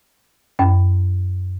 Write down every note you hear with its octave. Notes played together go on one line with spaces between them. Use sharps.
F#2 C#4